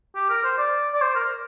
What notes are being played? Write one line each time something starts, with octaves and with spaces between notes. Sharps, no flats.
G4
A#4
C5
D5
D5
C5
A#4